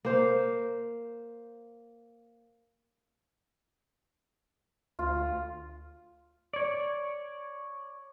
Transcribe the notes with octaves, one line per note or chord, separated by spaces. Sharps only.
A#3 C5 F5
D2 F4
C#5 D5